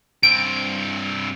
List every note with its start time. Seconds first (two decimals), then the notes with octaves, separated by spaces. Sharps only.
0.23 G2 C4 D7